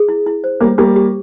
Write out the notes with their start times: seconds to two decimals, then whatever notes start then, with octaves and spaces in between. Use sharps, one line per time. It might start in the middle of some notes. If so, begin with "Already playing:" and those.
Already playing: G#4
0.09 E4
0.27 E4
0.44 C5
0.60 G3 A#3 C#5
0.78 G3 A#3 G4
0.96 G4